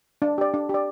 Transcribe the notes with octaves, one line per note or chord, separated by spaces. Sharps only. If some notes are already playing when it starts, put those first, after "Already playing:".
D4
G4 D5
D4
G4 D5